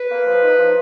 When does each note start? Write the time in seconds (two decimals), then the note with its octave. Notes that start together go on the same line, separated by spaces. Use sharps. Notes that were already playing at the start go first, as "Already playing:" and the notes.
Already playing: B4
0.09 A#3
0.26 F3
0.42 D#4
0.58 F3